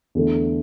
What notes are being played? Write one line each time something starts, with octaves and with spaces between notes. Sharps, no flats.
E2 D3 A3